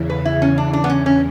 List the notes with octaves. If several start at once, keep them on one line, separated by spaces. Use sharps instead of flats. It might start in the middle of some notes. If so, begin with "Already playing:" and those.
Already playing: E2 C#3 E3
B4
E4
C#4
D4
D4
B3
C#4
C#4